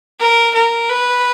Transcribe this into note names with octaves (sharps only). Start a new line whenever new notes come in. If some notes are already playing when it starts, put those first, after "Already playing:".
A#4
A#4
B4